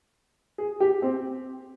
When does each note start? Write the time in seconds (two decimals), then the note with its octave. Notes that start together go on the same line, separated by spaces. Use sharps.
0.58 G#4
0.80 G4
1.02 C4